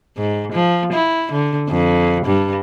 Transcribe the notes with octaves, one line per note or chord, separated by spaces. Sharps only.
G#2
F3
E4
D3
F2
G2